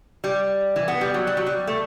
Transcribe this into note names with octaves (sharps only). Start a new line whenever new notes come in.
G3
E3
B3
G3
F#3
G3
F#3
G3
A3